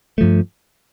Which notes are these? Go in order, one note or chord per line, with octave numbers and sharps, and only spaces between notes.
G2 F3 A3